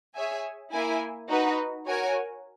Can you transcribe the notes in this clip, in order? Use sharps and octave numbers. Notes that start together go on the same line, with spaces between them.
G#4 C#5 E5 G#5
A#3 E4 A#4 E5 G#5
D#4 F#4 B4
F#4 A#4 C#5 G#5